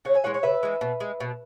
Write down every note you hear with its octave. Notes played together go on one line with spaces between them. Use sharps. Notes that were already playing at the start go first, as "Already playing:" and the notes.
C#3 C#5 F#5
E5 G#5
E3 G#3 C#5 F#5
C#5 F#5
C#3 B4 E5
E3 G#3
B2
G#3
B2